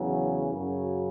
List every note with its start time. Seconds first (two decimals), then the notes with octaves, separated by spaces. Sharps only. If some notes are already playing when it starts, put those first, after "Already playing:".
Already playing: E2 C#3 F#3
0.50 F#2 C#3 F#3